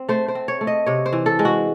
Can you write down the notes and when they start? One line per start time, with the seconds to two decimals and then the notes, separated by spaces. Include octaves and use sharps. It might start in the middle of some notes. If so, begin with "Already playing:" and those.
Already playing: C4
0.09 A3 C5
0.28 C5
0.35 C4
0.48 C#5
0.61 A3
0.67 D#5
0.86 C3 C#5
1.06 C5
1.13 E3
1.26 A4
1.39 G#3
1.45 F#4